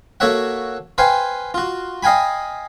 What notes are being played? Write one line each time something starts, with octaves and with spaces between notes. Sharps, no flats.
A#3 F#4 A4 C#5 E5 F#5
B4 C5 F5 G5 G#5
F4 F#4
D#5 F5 G5 G#5 B5